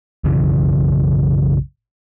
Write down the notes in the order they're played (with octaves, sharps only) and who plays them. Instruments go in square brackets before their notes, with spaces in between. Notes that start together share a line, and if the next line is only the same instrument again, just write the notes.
[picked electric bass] B1 F#2 C#3 E3